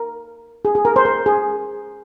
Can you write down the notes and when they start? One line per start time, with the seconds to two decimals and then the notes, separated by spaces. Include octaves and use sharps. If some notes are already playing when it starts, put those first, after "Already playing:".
Already playing: A#4
0.65 G#4
0.75 G#4
0.85 A#4
0.96 C5
1.05 A#4
1.26 G#4